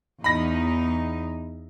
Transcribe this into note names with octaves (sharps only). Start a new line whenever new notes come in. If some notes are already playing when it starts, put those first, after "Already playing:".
E2 D#4 B5 A#6